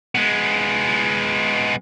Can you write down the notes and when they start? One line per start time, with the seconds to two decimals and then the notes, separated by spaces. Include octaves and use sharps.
0.15 G#3 B3